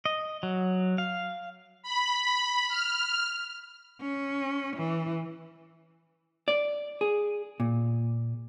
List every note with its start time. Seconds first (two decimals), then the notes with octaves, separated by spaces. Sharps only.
0.05 D#5
0.43 F#3
0.98 F5
1.83 B5
2.68 F6
4.01 C#4
4.77 E3
6.48 D5
7.01 G#4
7.60 A#2